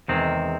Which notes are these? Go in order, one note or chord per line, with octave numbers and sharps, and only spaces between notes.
E2 C3 D#3 G#3 C4